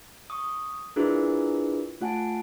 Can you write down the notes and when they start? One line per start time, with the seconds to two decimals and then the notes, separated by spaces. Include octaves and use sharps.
0.30 C#6 D#6
0.96 D4 E4 F4 G#4 A#4 B4
2.01 A3 F4 F#5 G#5 A5 D7